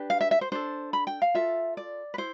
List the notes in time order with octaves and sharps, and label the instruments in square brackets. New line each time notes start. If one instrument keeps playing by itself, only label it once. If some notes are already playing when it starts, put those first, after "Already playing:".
Already playing: [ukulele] D4 G4 B4
F5
E5
E5
C5
D4 A4 C5
B5
G5
F5
F4 A4 E5
D5
B4
E4 C5